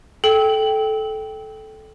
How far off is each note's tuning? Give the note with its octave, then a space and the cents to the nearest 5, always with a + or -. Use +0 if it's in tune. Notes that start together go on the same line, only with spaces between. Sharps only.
A4 -15 G5 -5